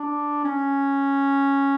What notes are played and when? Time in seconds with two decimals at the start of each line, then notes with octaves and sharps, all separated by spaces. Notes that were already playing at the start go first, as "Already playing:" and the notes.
Already playing: D4
0.44 C#4